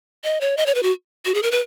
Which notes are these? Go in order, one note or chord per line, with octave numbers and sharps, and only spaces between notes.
D#5
C#5
D#5
C#5
B4
F#4
F#4
G#4
A#4
B4